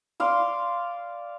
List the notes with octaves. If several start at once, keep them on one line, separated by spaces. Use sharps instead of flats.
D5 F5 C6